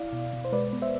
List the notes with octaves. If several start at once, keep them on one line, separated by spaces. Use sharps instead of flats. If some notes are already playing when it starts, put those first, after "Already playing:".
Already playing: E4 D5 F5
B2
B2
C5
G#3 B4 D5
B3
C5 E5